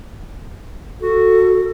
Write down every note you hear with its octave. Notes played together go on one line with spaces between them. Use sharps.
F#4 A4